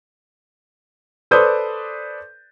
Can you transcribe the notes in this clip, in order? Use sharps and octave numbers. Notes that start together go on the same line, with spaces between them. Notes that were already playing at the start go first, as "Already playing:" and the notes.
A4 B4 C5 D5 D#6 G6